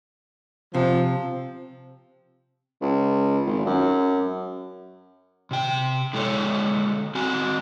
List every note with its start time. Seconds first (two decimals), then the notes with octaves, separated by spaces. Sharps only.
0.74 C3 F3
2.81 C#2
3.47 G#1
3.66 F#2
5.51 C3 G5
6.13 D3 G#3 A4 C#5
7.15 C4 F#4 G#5